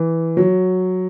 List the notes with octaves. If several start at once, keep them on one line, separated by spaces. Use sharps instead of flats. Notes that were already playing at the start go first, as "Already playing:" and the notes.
Already playing: E3
F#3